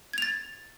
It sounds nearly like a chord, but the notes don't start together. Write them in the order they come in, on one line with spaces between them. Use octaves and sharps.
G#6 F7 A6